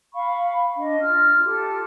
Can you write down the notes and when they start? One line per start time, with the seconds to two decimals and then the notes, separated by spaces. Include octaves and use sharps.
0.14 F5 B5 C#6
0.77 D4 D#5
1.01 F4 F6
1.44 F4 G4 A4